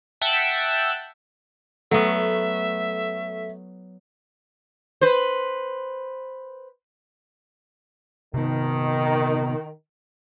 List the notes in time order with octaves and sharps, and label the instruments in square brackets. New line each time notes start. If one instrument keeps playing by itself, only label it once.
[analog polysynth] E5 F#5 G5 A5 E6
[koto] F#3 B3 [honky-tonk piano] A3 [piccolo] E5
[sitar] B4 C5
[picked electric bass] C3 B3 [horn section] D#3